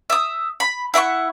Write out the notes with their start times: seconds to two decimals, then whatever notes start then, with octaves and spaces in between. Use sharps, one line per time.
0.10 E5 D#6
0.60 B5
0.94 E4 E5 F#5 C#6